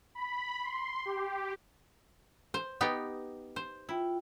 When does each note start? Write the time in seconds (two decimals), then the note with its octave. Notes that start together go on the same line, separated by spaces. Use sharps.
0.15 B5
0.63 C6
1.05 G4
2.54 C5
2.81 B3 D#4 G4
3.56 C5
3.89 E4 F4 G5